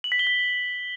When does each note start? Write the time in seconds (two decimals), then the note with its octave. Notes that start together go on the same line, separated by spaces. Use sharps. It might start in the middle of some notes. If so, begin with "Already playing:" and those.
0.04 F#7
0.12 B6
0.19 G7
0.27 B6